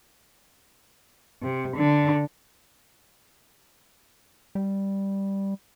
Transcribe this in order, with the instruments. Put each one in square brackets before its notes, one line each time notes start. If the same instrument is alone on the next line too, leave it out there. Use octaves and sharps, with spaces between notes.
[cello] C3
D3
[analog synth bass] G3